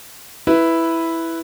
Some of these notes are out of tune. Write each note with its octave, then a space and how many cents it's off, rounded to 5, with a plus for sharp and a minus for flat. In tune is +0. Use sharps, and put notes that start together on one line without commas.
E4 +0 B4 +0